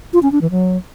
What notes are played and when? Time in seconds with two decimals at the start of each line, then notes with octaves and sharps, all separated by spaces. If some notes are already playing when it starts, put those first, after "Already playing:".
0.13 F4
0.23 C#4
0.32 D4
0.41 E3
0.51 F#3